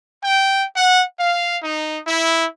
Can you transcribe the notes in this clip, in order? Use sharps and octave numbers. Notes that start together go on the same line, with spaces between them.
G5
F#5
F5
D#4
E4